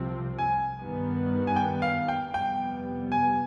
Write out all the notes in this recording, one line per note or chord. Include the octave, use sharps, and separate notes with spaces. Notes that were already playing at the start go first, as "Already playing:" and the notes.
Already playing: C2 C3 F3 C4
G#5
G2 D#3 G3 B3
G#5
G5
F5
G5
F2 C3 G3 B3 G5
G#5